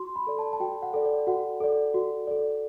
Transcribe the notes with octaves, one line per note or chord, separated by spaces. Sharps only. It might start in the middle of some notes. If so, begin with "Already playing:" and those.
Already playing: F#4 C6
B5
A4 D5
A5
A5
F#4 G5
F#5
A4 D5
D5
F#4 F#5
A4 D5
F#4
A4 D5